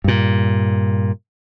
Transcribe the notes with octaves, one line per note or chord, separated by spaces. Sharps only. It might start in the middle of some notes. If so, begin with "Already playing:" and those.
G2 A#2